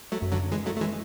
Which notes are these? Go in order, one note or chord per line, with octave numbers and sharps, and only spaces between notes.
F#3 A3
F#2
D3 F#3
E3 G#3
F#3 A3
A3
E3 G#3